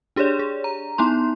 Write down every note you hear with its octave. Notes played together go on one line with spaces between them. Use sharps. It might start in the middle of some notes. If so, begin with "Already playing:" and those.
D4 G4 G#4 C#5 D5
G#4
A#5
B3 D#4 E4 C6